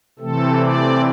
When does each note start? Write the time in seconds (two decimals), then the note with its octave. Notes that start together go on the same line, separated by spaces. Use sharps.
0.19 C3 E3 A3 C4 A4
0.59 D5